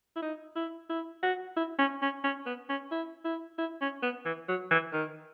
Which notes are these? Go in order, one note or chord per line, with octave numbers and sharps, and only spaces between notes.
E4
D#4
E4
E4
F#4
E4
C#4
C#4
C#4
B3
C#4
E4
E4
E4
C#4
B3
E3
F#3
E3
D#3